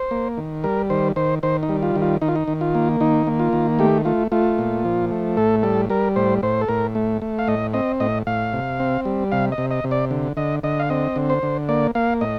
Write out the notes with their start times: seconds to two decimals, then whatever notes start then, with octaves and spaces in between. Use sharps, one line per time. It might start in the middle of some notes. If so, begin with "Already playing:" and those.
Already playing: C5
0.11 A#3
0.37 D#3
0.64 G3 A#4
0.90 D#3 C5
1.16 D#3 C5
1.43 D#3 C5
1.63 D#4
1.69 G3
1.83 F4
1.96 D#3
2.02 F4
2.21 D#3 D#4
2.28 F4
2.36 D#4
2.48 D#3
2.61 F4
2.75 A#3
3.00 D#3 D#4
3.27 A#3
3.39 F4
3.53 D#3
3.79 A3 G4
4.05 A3 F4
4.32 A3 F4
4.58 A#2
4.85 F3
5.11 A3
5.37 A2 A4
5.63 G3 A4
5.90 G3 A#4
6.16 A2 C5
6.43 A2 C5
6.62 A4
6.68 A2 A#4
6.95 A3
7.22 A3
7.39 F5
7.48 A2 D#5
7.74 C4 D#5
8.00 A2 D#5
8.27 A2 F5
8.53 C3
8.80 C4
9.05 G3
9.32 C3 F5
9.52 D#5
9.58 C3
9.71 D#5
9.84 C3
9.91 D5
10.11 D3
10.37 D3 D#5
10.63 D3 D#5
10.80 F5
10.90 C4 D#5
11.16 D3
11.30 C5
11.43 D3
11.69 A#3 D5
11.95 A#3 F5
12.21 A2 D#5